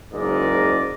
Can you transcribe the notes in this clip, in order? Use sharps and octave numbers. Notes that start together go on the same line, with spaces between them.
F#1 G#2 A#4 D5 D#5